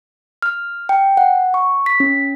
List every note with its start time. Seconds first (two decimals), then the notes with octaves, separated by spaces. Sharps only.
0.42 F6
0.89 G5
1.17 F#5
1.54 C#6
1.86 B6
2.00 C#4